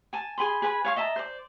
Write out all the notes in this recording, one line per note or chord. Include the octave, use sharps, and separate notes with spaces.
G#5 A5
G#4 G#5 B5 C6
G#4 B4 G#5 B5
C#5 F5 C#6
D#5 E5 A5 A#5
C5 D5